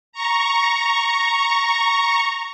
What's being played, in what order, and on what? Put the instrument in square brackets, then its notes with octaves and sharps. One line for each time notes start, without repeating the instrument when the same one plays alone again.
[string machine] A#5 C#6